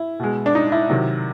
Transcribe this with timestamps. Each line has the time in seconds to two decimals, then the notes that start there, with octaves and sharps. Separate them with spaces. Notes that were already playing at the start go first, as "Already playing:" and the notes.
Already playing: E4
0.20 B2 G#3
0.46 D4
0.55 D#4
0.72 E4
0.90 C3 D#3 F#3